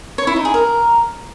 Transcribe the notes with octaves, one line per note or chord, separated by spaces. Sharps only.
C#5
E4
D#4
G#4
A#4